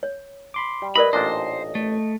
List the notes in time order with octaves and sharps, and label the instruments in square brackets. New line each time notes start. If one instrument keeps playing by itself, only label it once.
[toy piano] C#5
[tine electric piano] B5 C6 D6
[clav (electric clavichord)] G3
[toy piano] G4 A#4 D5 [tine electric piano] B4 D#5 [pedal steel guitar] B5
[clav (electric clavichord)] A1 A#2 D4 [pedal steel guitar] C5 [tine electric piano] D#5
[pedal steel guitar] A3